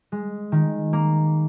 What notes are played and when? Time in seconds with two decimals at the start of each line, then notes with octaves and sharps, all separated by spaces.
0.12 G#3
0.52 D#3
0.93 A#3